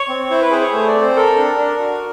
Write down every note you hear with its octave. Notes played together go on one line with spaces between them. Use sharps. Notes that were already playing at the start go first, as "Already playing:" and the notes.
Already playing: C#5
C4
E4 C5
B4
G#4 C5
C#5
A3 C5
D5
C4
C5
A4 A#4
D4
D4
F#4